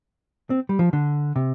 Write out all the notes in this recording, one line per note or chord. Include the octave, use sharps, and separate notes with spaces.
C4
G3
F3
D3
C3